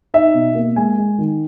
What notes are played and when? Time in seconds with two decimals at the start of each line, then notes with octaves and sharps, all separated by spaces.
0.14 D#4 E5
0.34 B2
0.55 A#3
0.76 G#3 G#5
0.98 G#3
1.19 D#3